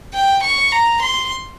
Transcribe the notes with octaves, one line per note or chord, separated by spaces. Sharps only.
G5
C#6
A#5
C6